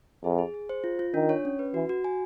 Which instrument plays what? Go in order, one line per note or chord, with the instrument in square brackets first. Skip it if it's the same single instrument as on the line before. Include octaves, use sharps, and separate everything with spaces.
[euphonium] F2 [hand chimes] G#4
[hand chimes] G#4
G#4
C5
F4
F4
[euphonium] D#3 [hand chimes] D4
[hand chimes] C#5
C#4
B4
[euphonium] E3 [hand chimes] F#4
[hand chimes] F#4
G#5